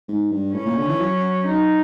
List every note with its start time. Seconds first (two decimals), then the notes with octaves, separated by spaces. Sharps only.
0.08 G#2
0.32 G2
0.54 A2 C#4
0.66 A#2
0.78 D3
0.89 E3
1.01 F#3
1.47 D#4